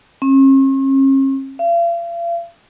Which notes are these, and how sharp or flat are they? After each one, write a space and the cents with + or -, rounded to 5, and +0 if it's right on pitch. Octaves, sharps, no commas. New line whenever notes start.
C#4 -45
F5 -40